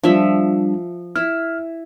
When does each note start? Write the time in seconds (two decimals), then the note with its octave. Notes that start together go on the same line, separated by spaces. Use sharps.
0.03 F3 G3 D4 E5
1.16 E4 F6